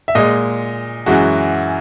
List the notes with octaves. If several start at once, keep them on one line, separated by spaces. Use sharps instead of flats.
E5
A#2 G#3 D#5
F#2 E3 G#3 F#4